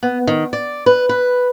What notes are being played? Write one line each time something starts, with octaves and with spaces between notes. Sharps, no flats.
B3
D#3
D5
B4
B4